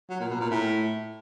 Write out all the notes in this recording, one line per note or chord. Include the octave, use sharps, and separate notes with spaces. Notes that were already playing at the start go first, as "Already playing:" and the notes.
F#3
A#2
B2
A#2
A2